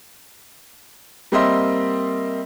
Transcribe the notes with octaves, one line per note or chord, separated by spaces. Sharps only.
G3 A#3 C4 D#5 E5 C6